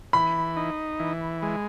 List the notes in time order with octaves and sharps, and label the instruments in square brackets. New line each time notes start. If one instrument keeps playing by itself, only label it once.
[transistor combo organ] E3 [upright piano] B5
[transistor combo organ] D#4
E3
G#3